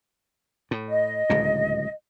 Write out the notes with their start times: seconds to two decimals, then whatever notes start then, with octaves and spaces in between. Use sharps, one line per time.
0.71 A2
0.89 D#5
1.30 D1 C#2 A#2